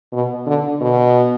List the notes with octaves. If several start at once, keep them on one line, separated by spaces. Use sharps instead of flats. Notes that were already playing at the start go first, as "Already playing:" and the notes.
B2
D3
B2